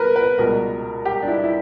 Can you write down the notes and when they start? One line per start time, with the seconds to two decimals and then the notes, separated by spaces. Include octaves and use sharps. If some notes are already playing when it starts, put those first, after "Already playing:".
Already playing: A#4 B4
0.16 B4
0.38 C#2 B2 G3 A#4
1.05 G4
1.22 D4
1.28 E4
1.44 E4